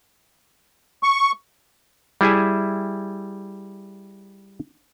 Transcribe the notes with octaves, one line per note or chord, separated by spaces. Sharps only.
C#6
G3 E4 G#4 E5 G#5